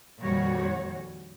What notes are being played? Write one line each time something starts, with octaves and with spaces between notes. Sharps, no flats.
F2 A#2 D#3 G3 F#4 C#5